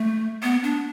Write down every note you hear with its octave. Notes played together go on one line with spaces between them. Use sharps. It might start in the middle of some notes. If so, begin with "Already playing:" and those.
Already playing: A3
B3
D4